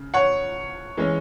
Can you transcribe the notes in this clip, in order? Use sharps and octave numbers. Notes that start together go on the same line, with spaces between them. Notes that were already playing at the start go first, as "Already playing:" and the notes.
Already playing: C#3
C#5 F#5
E3 G#3 C#4